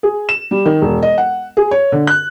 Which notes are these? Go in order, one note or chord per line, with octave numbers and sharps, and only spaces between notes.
G#4
E7
G3
D#3
E1
D#5
F#5
G#4
C#5
D3
F#6